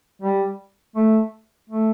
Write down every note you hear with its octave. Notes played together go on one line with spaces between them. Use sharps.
G3
A3
A3